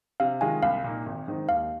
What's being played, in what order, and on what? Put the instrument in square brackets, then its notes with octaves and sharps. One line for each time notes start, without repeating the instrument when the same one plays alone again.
[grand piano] C3 [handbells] F5
[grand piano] D#3 G#3 F4 [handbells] G#5
[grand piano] C2 [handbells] F5
[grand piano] A#2 A#3 D#4
G#1
G#2 D#3 C4 D#4
[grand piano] D#2 [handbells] F5